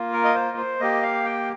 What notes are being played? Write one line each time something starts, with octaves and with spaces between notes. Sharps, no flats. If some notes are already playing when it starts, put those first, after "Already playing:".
Already playing: A#3 F4
A#4
D#5
C5
C5
A#3 G4 D#5
F5
G5